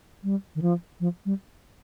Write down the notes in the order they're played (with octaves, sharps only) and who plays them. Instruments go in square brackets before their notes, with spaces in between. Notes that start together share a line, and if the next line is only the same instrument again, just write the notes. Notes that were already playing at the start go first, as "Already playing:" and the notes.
[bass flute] G3
D#3
F3
F3
G3